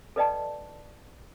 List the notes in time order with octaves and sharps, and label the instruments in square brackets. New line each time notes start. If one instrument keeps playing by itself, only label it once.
[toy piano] A4 B4 D5 D#5 G5 A5